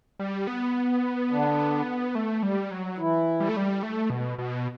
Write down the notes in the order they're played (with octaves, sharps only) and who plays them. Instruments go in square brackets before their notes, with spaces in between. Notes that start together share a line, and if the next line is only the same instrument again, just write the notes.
[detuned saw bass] G3
B3
[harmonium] D3 D4
[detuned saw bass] A3
G3
F#3
[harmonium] E3 E4
[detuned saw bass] G3
A3
G3
A3
B2
B2